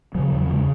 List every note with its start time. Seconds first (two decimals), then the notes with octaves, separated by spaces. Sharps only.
0.15 C#3 F#3
0.28 F#3
0.32 E2
0.41 F#3
0.48 C#3 G#3